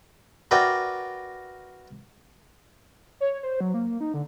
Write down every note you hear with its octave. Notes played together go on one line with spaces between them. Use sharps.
F#4 A#4 B4 D5 E5 G5
C#5
C5
F#3
A#3
D#4
D3